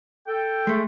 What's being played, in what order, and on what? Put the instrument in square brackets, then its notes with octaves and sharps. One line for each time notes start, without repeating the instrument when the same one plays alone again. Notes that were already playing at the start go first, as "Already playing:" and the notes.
[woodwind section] A4 G5
[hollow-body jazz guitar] G#3 A3